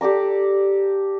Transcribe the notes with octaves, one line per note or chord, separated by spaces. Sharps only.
G4 A4 D5 A#5